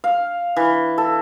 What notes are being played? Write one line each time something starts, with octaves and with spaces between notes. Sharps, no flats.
F5
E3
A4